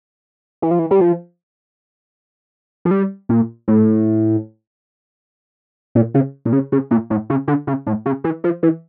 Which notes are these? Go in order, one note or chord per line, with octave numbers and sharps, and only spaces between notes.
E3
F3
E3
G3
F3
F3
G3
A#2
A2
A#2
C#3
A#2
C#3
C#3
A#2
A2
C#3
D3
C#3
A2
C#3
E3
F3
E3